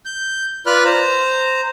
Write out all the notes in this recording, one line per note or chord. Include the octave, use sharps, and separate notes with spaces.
G6
F4 B4 D5 B5 F6 F#6
C5 A#5